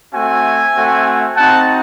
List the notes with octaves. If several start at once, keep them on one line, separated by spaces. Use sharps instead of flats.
A3 C4 F#4 E5 G#5
A3 C4 F#4
C4 D#4 F#4 F#5 A5